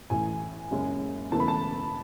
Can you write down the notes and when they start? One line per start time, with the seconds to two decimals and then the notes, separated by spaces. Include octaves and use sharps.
0.10 A1 A2 E3 G#5
0.71 F#1 F#2 C#3 G#3 C#4
1.32 E1 E2 C#3 E3 A3 A5
1.40 B5
1.48 A5